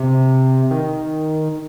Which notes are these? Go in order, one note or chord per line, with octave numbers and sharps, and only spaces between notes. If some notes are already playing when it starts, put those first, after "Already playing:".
Already playing: C3
D#3